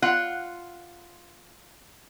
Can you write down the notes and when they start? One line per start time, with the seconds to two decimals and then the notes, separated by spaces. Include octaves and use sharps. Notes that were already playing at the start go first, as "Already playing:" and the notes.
0.02 F4 F#5